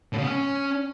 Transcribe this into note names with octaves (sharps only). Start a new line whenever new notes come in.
A2
C#3
B3
C#4